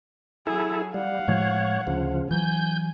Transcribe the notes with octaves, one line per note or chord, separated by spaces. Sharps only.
F#3 E4 G#4 A4
G3 F5 F#5
A2 F3 G#3 C#5
D2 C#3 F3
E3 F#3 G#5 G6